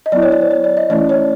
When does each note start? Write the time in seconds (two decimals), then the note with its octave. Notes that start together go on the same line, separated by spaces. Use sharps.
0.06 D#5
0.12 F#3 B3 E4 D5
0.22 C#5
0.32 D5
0.41 C5
0.51 C#5
0.64 D5
0.77 D#5
0.89 E3 A3 C#4 E4 D5
1.09 C#5